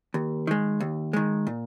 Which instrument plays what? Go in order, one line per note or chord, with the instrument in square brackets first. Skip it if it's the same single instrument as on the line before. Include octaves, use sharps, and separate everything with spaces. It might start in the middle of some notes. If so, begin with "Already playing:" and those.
[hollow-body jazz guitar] D#2
D#3 G#3
D#2
D#3 G#3
A#2